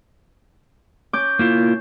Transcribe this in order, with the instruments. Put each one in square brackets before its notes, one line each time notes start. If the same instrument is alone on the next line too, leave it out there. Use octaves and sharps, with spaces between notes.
[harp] C#4 D6 G6
[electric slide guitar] A#3 E4 F4